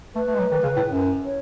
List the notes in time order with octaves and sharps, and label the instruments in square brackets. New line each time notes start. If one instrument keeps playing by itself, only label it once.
[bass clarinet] A3 [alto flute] B4
[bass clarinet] A3
G#3
F#3
D#3
C#3
A2
F#2
[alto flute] C#5